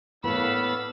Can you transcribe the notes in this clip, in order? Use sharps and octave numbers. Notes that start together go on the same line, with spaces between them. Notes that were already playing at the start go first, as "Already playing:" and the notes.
A2 A#3 B3 D4 C#5 F5 B5 E6